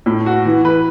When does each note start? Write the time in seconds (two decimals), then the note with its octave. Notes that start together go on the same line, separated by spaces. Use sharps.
0.06 A2
0.26 F#4
0.45 E3
0.65 B4